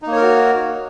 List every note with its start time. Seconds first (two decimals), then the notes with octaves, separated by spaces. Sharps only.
0.02 D#4
0.07 A#3
0.12 C#5
0.17 A#4
0.22 F#4